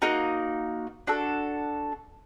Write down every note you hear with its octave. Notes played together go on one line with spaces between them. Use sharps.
A#3 D#4 F#4
D4 F#4 A4